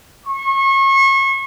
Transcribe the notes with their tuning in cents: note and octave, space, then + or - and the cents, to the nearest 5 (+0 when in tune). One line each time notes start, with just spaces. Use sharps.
C#6 -35